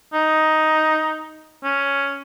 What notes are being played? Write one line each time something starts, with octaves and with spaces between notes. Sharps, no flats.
D#4
C#4